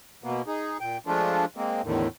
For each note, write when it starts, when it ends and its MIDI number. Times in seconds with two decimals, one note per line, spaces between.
0.24 0.42 47
0.24 0.42 58
0.24 0.42 59
0.47 0.77 63
0.47 0.77 68
0.80 0.98 46
0.80 0.98 79
1.07 1.45 53
1.07 1.45 56
1.07 1.45 57
1.07 1.45 62
1.07 1.45 65
1.57 1.82 56
1.57 1.82 58
1.57 1.82 60
1.84 2.08 40
1.84 2.08 45
1.84 2.08 50
1.84 2.08 51